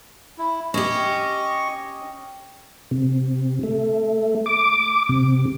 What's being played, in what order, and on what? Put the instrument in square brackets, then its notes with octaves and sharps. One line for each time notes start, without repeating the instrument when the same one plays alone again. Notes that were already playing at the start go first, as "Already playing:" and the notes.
[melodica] E4
[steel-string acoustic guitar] C#4 G4 [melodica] D#5 C#6
[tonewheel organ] C3
A3
D6
C3